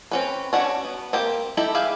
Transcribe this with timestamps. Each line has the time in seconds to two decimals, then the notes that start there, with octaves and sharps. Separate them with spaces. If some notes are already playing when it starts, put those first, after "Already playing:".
0.11 C4 C#4 B4
0.53 C#4 D4 F#4 C#5
0.85 B3
1.13 A#3 C4 G4
1.57 D#4 E4 G4 A4 E5
1.75 G4 G#4 B4 E5 F5